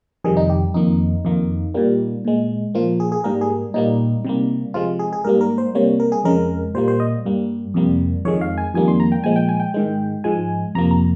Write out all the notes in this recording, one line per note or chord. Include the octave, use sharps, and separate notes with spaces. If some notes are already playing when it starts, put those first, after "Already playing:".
F2 C3 D#3 G3 G#4
D#4
G4
F2 D#3 A#3 D#4
F2 D#3 A#3
A#2 G3 A#3
A#2 G#3
A#2 F3 A#3 F4
G#4
G#4
G#2 G3 A#3 A#4
G#4
A#2 G3 A#3 D#4
C3 G3 A#3
C3 F3 G#3 F4
G#4
G#4
G#2 G3 A#3 A#4
A#4
C5
C3 G3 A#3 C#5
A#4
G#4
F2 C#3 G#3 A#4
A#2 G3 A#3 C5
C5
D#5
G2 G3 A#3
F2 C3 G3 A#3
F2 D#3 G#3 C#5
F5
G#5
F2 D#3 G3 A#3 G#5
C6
A#5
G5
A#2 F3 G#3 G#5
G5
G#5
G5
G#2 D#3 G#3
G#2 F3 G#3 G#5
F2 C3 F3 A#3 A#5
A#5